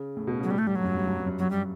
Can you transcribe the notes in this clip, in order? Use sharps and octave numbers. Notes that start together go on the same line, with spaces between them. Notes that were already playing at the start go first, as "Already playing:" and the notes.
Already playing: C#3
A2
B2
C#3 F#3
A2 G3
A3
G2 G3
F#3
F#2
G2
G2
G2
F#2
F#2 F#3
G3